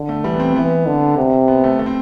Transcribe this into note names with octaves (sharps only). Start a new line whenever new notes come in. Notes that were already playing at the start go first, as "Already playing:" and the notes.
Already playing: D3
A3
E3 G3
B3
C4
E3 B3
D3
C3
B3
A3
A3
C4